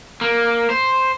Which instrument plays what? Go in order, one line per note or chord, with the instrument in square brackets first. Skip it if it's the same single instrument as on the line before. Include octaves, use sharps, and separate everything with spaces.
[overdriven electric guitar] A#3
C5